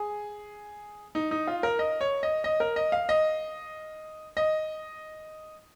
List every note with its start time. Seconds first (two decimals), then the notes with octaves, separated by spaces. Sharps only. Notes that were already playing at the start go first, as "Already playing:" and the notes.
Already playing: G#4
1.15 D#4
1.31 D#4
1.47 F4
1.63 A#4
1.79 D#5
2.01 C#5
2.23 D#5
2.44 D#5
2.60 A#4
2.76 D#5
2.92 F5
3.09 D#5
4.37 D#5